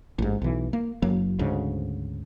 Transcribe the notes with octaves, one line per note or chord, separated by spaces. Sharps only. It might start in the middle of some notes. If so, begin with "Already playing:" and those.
A1 G#2
B1 E3
A#3
F#1 F#3 A#3
D2 G#2 C#3